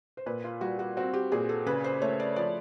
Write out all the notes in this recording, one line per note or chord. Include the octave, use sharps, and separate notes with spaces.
C5
A#2 B4
F4
G3 F#4
F#4
C4 F#4
G4
A#2 G#4
A4
C#3 B4
C5
A3 C#5
D5
F3 D5